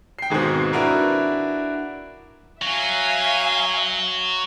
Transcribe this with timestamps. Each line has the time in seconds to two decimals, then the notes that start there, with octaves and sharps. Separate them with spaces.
0.19 G5 C7
0.30 D#2 G#2 B2 D#3 C4
0.73 D4 E4 F#4 A#4 B4
2.62 F#3 E5 F5 G#5